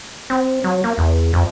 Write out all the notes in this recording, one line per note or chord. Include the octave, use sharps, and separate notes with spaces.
C4
F#3
A#3
E2
F2